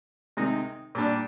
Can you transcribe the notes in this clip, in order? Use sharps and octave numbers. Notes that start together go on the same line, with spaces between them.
C3 D#3 G#3 D#4
A#2 G3 D4